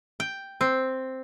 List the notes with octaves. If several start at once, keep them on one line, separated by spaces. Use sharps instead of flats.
G5
C4